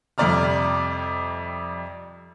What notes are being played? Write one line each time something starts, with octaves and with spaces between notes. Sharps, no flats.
F2 C3 G3 D5 A#5 F6